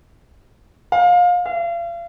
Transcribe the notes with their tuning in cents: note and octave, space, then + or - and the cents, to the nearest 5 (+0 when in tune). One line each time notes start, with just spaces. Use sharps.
F5 +25
F5 -40